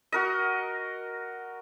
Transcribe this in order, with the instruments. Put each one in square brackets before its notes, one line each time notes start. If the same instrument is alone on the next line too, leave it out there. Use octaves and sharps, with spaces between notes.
[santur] F#4 A#4 D#5